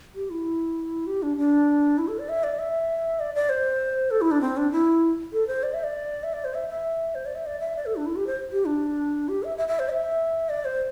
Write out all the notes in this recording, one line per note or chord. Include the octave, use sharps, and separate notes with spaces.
G4
E4
G4
D4
D4
E4
A4
D5
E5
D5
E5
D5
D5
C5
A4
E4
D4
C4
D4
E4
A4
C5
D5
E5
D5
E5
D5
C5
E5
E5
C5
D5
E5
D5
E5
D5
A4
D4
E4
G4
C5
G4
D4
G4
E5
E5
E5
C5
E5
D5
C5